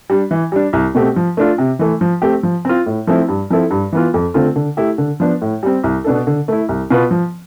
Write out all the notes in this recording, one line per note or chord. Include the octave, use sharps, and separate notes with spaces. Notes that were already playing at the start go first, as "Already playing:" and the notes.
G3 D4
E3
G3 D4
C2
B2 A3 C4 G4
F3
A3 D4 F4
C3
E3 A3
F3
A3 C4 G4
F3
C4 F4
A2
F3 A3 C4 E4
G2
F3 C4 E4 A4
G2
E3 B3 F4
F2
D3 A3 C4 F4
D3
A3 E4 G4
D3
F3 B3 D4
A2
G3 C4
C2
B2 B3 D4 A4
D3
A3 E4
C2
B2 B3 F4 B4
F3